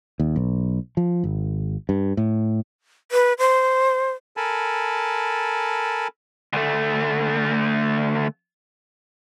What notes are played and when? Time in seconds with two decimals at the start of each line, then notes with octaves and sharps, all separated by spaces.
0.19 D#2
0.36 B1
0.97 F3
1.24 G#1
1.89 G2
2.17 A2
3.12 B4
3.39 C5
4.37 A4 A#4 G#5 A5 B5
6.53 D2 A3